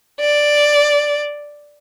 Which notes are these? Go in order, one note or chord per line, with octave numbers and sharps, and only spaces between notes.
D5